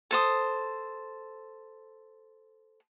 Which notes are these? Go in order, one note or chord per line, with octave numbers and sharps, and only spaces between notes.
A4 C5 D#6